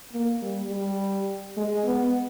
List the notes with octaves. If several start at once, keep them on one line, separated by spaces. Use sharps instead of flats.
A#3
G3
G3
G#3
B3